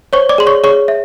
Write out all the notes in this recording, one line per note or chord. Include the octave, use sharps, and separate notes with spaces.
C5 C#5 C#6
D5 D6
G#4 C6
C#5 C#6
G#4 C#5 C#6
E5